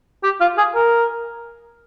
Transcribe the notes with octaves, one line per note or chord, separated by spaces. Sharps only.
G4
F4
G#4
A#4